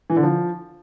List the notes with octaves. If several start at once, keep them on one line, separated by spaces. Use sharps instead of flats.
E3
D3
F3